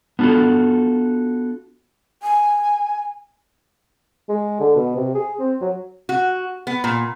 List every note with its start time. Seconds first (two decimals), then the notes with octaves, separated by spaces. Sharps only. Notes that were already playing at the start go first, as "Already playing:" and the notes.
0.19 B3 D4 F4 F#4 A4
2.22 G#5
4.29 G#3
4.60 D3
4.76 B2
4.96 C3
5.15 G#4
5.39 C4
5.61 F#3
6.09 F#4
6.67 B3
6.84 A#2